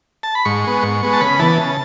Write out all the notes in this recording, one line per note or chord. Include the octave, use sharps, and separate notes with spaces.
A5
B5
G#2 C#6
G#3 B3
G#2
G#3 B3
A5
C#3 B5
E3 B3 A5
C#3